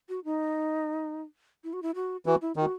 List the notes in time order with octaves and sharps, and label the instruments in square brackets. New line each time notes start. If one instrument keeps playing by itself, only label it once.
[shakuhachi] F#4
D#4
E4
F#4
E4
F#4
[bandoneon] E3 [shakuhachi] F#4
[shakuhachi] E4
[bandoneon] D#3 [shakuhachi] F#4